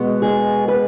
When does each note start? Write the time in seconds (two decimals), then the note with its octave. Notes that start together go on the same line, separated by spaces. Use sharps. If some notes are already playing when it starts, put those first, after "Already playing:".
Already playing: B2 G#3 B3
0.22 G#4
0.68 B4